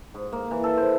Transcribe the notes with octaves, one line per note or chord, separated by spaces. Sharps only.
G#2
A#3
E3
A4
C5